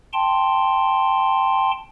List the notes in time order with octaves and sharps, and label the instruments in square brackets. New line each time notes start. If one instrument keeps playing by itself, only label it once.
[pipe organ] G5 A5 C6